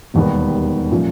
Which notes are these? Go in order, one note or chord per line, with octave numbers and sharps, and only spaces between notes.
E1 D#2 D#3 G3 B3
A#2 F3 A3 C#4